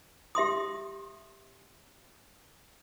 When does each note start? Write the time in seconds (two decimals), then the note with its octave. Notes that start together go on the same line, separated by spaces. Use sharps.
0.35 G4 E5 C6 D#6